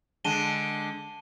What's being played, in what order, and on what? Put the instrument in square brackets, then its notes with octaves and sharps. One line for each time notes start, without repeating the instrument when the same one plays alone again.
[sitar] D3 G#3 [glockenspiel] A5 D#7 G7